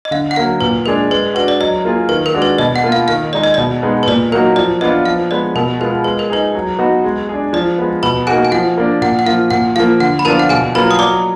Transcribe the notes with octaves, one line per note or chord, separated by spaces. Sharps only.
D#5
D3 F5
F#5
F#3 A#3 F5
A#2 B4
G#3 D4 G#4 A#4
G#3 B4
D4 F#4 B4
D5
F#3 D#5
A#3 F4 G#4
D#3 B4
A#4
G#3 D4 F#4
B4
B2 D#5
F#5
A#3 F4
F5
D#3 F5
G#3 D#4 G#4 D5
D#5
B2 D5
G#3 B3 D#4
B4
A#2 D5
F#3 A#3 D#4 F#4 A#4
F3 D5
B3 D4 F4 D#5
F3 F5
G#3 B3 D5
B2 A#4
G#3 B3 F4 A#4
G#3 B4
A#4
D#4 G#4 B4
F#3
B3 D#4 F#4
G#3
D4 G#4
F3 D5
G#3 B3
B2 B4 B5
A#3 D#4 F#4 G#4 G#5
G#5
F3 F#5
A#3 D4
A#2 F#5
F#5
F3 A#3 F4 F5
A#2 F#5
F3 A#3 F5
D3 F#5
B5
F3 B3 D4 F4 A#4 A#5
F#5
B2 G#4 G#5
F#3 A#3 F4 B4 B5
D#6
F#3 D5 D6